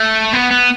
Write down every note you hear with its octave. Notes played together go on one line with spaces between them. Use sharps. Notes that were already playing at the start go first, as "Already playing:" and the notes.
Already playing: A3
B3
B3